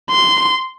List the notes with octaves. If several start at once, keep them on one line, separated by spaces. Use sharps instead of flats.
C6